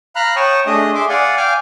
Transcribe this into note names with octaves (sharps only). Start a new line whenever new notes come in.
F5 A#5 B5 F6 F#6
C#5 G5 A5 C#6 D#6
A3 D4 G#4 D#5 D#6
G#4 E5 C6 D6
D5 F5 F#5 G#5
F5 G5 G#5 D6 F6